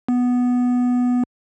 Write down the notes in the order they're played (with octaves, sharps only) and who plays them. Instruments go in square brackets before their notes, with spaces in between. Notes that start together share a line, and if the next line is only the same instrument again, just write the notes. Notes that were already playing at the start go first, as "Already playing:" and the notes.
[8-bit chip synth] B3